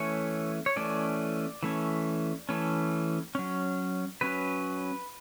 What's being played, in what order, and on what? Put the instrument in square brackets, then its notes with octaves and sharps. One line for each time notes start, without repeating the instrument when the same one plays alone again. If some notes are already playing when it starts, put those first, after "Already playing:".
Already playing: [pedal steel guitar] E3 A3 C#4 C#5
C#5
E3 A3 C#4 D5
E3 A3 C#4
E3 A3 C#4
F#3 C#4
F#3 C#4 B4